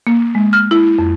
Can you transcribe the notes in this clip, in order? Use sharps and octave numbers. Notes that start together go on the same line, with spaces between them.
A#3
G#3
F6
E4
F2